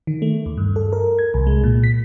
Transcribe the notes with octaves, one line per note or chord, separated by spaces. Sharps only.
D#3
A3
D#2
G2
A4
A#4
G#6
C2
G#3
A#2
B6